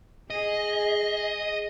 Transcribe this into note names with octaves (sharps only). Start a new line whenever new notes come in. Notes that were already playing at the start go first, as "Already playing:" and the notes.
G#4 D#5